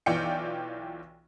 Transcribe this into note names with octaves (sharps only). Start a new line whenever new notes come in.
B1 E3 F4 D5 G5 C#7